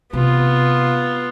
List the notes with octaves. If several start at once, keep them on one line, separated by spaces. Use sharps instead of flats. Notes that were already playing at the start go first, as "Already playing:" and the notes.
C3 B3 F4